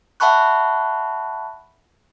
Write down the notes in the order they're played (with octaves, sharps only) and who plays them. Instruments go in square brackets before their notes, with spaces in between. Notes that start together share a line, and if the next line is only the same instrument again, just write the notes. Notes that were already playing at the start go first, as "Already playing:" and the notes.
[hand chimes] E5 F#5 A5 B5 C#6 F#6